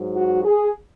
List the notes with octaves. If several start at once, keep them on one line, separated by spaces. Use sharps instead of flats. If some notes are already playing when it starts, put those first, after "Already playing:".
Already playing: G#2 F#3
F#4
G#4